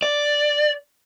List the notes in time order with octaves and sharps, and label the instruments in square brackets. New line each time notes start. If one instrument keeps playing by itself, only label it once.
[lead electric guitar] D5